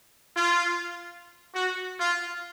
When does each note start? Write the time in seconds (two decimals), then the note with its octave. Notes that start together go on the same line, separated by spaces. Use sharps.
0.35 F4
1.54 F#4
1.99 F4